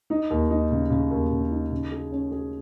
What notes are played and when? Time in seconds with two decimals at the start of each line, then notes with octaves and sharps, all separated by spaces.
0.10 D#4
0.30 D#2
0.50 D#4
0.71 C#3
0.90 C#3
1.11 D#2
1.31 C#3
1.51 D#4
1.71 C#3
1.92 G#4
2.12 C#4
2.31 G#4